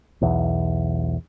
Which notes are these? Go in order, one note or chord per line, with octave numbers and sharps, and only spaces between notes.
B1 E2